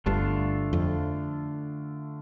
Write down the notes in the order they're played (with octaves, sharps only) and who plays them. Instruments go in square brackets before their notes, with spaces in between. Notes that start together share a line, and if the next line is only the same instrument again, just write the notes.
[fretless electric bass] G1 G2 [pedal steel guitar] D3 A3 D4 F4
[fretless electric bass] F2